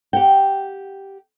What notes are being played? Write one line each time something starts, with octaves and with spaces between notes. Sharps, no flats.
G4 F#5 G5